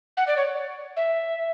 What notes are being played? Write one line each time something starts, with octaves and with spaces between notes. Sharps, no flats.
F#5
D5
C#5
E5